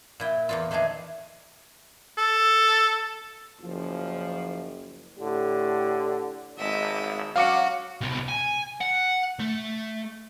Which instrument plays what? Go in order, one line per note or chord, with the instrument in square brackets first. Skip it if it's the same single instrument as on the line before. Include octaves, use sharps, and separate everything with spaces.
[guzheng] A#2 E4 G5
E2 A#2 F4
D#3 E3 A3 D4 G#4
[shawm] A4
[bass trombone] F#1 [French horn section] F3
[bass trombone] A2 [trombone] D3 [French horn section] G4
[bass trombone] G#1 [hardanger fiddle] G#3 E5
[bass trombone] F#3 [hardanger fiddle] C#4 F#4 [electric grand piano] F5 D6 C#7
[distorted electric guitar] C2 B2
G#5
F#5
A3